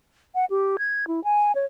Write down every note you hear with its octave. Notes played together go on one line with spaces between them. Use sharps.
F#5
G4
G#6
E4
G#5
C#5